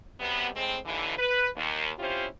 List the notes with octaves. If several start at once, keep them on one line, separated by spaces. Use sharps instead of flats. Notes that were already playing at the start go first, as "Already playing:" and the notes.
F#2 C3 G3 B3
A2 G#3 C4
D#2 D3 E3
B4
D#2
C4 C#4 E4 F4 G4 C5